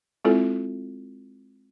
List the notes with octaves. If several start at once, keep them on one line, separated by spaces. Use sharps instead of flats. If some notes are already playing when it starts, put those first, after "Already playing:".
G#3 C4 E4 F4 A4